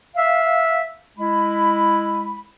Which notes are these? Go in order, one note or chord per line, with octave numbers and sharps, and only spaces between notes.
E5 F5
G#3 E4 B5